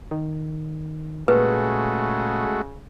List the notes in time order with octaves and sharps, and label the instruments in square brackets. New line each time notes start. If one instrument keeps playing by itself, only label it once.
[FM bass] D#3
[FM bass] A#2 [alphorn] C#3 [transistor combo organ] G#3 A3 F#4 [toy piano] B4